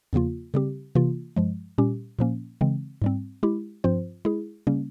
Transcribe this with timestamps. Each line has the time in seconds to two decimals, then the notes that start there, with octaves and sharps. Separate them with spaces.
0.13 E2 C#3 F3 A#3 F4
0.54 C#3 G3 C4 G4
0.95 C3 E3 A#3 F4
1.36 G2 F3 G#3
1.78 A#2 G3 C#4 G4
2.19 A#2 F3 A#3 C#4
2.61 C#3 E3 G#3 C4
3.02 G#2 G3 C4
3.43 G#3 E4 G4
3.84 G2 F3 C4 F4 C5
4.25 G#3 E4 G#4
4.67 C#3 G3 A#3 C#4